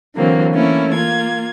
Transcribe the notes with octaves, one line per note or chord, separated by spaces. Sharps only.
D3 E3 F#3 A#3 C4
E3 A3 A#3 C#4 E4
A#3 F4 G#6